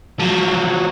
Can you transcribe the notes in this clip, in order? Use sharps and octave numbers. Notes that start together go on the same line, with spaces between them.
F3 F#3